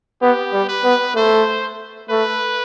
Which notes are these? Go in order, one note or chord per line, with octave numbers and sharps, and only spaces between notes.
B3 G4
G3
B4
B3
A3 C5
A3 B4